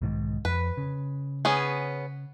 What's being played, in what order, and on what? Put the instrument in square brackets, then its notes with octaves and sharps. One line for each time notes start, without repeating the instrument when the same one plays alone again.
[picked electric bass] B1 G#2 D#3
[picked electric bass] F2 [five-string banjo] B4
[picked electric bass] C#3
[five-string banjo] B3 C#4 G#4